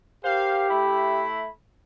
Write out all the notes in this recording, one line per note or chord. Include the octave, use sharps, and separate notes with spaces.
G4 A#4 C5 F5
A3 E4 B5